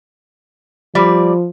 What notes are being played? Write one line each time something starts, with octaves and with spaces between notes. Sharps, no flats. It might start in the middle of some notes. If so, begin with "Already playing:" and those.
F3 G3 D5